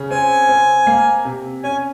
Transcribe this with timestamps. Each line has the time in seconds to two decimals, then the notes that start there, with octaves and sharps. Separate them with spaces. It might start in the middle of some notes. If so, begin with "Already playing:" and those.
Already playing: C#3
0.10 C4 G#5
0.48 C4
0.87 A#3
1.25 C3
1.63 C#4 G#5